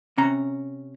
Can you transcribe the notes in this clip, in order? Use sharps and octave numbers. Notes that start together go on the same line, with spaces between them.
C3 C#4 A#5